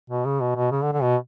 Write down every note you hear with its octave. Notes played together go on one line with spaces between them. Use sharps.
B2
C#3
B2
B2
C#3
D3
D3
B2